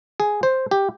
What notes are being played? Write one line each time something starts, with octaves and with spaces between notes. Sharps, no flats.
G#4
C5
G4